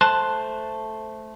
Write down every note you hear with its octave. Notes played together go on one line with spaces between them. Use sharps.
A3 C5 A5 C6 F#6